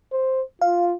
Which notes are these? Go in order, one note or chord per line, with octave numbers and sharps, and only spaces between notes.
C5
F4 F5